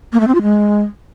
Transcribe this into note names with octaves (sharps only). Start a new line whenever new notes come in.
A#3
A3
C4
F4
G#3